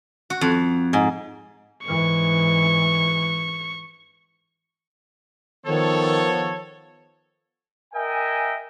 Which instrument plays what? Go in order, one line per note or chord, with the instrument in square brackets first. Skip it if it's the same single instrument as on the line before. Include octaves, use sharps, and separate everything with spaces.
[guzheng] F#4
F2
[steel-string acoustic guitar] G#2
[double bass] G#2 E3 [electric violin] C#6
[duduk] D#3 [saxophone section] F3 B3 [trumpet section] A4 C#5
[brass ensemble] A#4 D#5 E5 G5 G#5